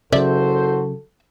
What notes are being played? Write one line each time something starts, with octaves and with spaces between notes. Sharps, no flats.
F#1 C#3 F#3 F#4 A4 C5 D5 E5